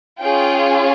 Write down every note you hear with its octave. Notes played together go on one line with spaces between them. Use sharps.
C#4 F4 G#4 G5